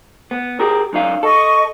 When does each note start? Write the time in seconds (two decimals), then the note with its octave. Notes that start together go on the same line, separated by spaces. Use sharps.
0.31 B3
0.60 G4 G#4 A#4
0.93 F#2 D#4 F5
1.23 A4 D#5 C#6